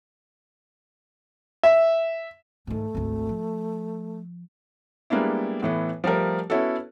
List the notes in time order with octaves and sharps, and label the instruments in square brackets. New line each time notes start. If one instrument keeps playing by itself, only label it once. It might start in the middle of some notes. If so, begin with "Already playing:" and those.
[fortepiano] E5
[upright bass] G#2 D#3 [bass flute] A3
[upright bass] G#1 D2
F3
[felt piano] G3 G#3 A#3 B3 D4 E4
A2 E3 B3
F3 G3 A3 A#4
B3 C#4 E4 F#4 A4